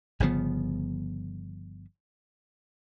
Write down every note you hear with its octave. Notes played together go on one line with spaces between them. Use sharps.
G1 C#3 F3 B3